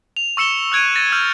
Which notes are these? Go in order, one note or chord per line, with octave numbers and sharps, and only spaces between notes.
F7
C#6 E6 C#7 E7 G7
E6 F#6 G#6 D7 D#7
A6 A#6 D#7
E6 F6 G6 G#6